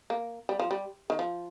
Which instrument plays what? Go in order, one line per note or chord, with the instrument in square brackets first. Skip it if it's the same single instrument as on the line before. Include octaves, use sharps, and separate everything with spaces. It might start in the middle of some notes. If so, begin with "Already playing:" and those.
[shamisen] A#3
G3
F3
G3
D#3
F3